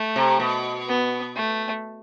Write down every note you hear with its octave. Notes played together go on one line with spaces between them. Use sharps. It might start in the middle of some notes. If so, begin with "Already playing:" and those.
Already playing: A3
C3
B2
B3
A3